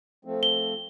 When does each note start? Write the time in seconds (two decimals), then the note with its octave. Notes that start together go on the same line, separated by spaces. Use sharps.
0.25 F3 A3 C4
0.43 G7